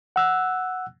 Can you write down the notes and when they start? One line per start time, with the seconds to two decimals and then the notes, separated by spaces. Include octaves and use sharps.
0.16 F#5 E6 F#6